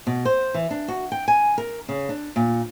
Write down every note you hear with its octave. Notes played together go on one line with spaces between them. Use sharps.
B2
C5
E3
D4
F#4
G5
G#5
A#4
C#3
D4
A#2